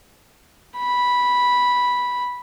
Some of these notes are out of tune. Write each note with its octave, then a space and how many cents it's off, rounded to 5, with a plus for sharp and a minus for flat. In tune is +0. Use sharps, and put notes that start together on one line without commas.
B5 -5